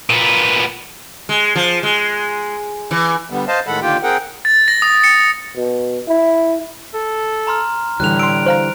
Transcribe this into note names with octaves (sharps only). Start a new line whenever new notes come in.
A#2 B3
G#3
F3
G#3
E3
D3 G3 B3
C5 D#5 F5 A5
A2 D#3 G#3 A4 F#5 B5
D3 D#3 A#3 F4 G4 G5
C4 G#4 A#4 F#5 G5
A6
A#6
D#6
C#7
B2
E4
A4
A#5 C6 F6
A2 D3 E3 G3 F#6 F7
C6 E6 D7
C5 F5 A#5